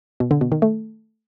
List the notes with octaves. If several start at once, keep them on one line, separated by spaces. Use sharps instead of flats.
B2
D3
B2
D#3
A3